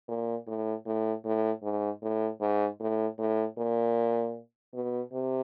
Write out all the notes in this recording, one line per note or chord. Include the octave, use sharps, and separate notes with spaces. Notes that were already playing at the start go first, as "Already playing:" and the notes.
A#2
A2
A2
A2
G#2
A2
G#2
A2
A2
A#2
B2
C3